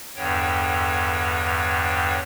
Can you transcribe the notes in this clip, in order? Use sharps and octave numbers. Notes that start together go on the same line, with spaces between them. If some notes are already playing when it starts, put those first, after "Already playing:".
E2 G2 D3 C#5 G5